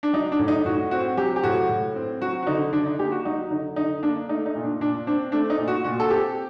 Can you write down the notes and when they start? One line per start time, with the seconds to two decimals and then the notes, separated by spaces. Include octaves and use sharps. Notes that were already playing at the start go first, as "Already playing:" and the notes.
0.03 D4
0.13 F#3 D#4
0.32 D4
0.39 A2
0.48 D#4
0.65 A2 F#4
0.91 C4 F#4
1.17 F#3 G4
1.36 G4
1.44 A2 F#4
1.69 A2
1.96 C4
2.21 F#3 F#4
2.43 F#4
2.47 D3 D#4
2.73 D3 D4
2.86 D#4
2.99 A#3 G4
3.12 F#4
3.25 F#3 D#4
3.51 D3 D#4
3.76 D3 D#4
4.02 A#3 D4
4.29 A3 D#4
4.46 D#4
4.55 A#2
4.63 D4
4.80 A#2 D4
5.07 C4 D4
5.32 A3 D4
5.50 D#4
5.58 A#2
5.68 F#4
5.84 A#2 F#4
6.00 A4
6.10 C4 G4